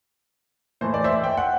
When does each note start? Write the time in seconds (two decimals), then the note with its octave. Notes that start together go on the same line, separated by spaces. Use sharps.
0.81 A2 E3 A3 C5
0.94 D5
1.04 C5 E5
1.24 G5
1.37 F#5